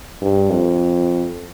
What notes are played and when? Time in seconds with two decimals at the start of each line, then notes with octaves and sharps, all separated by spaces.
0.22 G2
0.50 F2